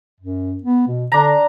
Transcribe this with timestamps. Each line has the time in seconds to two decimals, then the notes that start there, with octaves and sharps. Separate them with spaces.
0.20 F#2
0.63 B3
0.87 B2
1.12 D3 D4 A#5